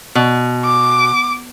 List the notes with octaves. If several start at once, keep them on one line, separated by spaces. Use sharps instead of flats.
B2
D6